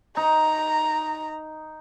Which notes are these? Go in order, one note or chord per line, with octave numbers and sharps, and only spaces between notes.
D#4 A#5